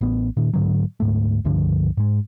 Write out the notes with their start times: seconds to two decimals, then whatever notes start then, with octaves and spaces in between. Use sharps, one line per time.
0.01 A1 B3
0.37 A#2 D#3
0.54 G#2 D3 F#3
1.00 D2 G#2 A3
1.44 C#2 G2 D3 F3
1.97 G#2 G#3